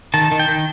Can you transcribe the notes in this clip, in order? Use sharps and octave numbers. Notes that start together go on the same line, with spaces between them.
D#3 A5
D#3
G5
D#3